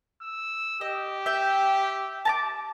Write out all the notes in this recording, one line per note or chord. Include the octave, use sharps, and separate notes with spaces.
E6
G4 D#5
E5 G5
A5 A#5 D6